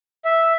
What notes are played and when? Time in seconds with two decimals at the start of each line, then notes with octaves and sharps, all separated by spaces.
0.25 E5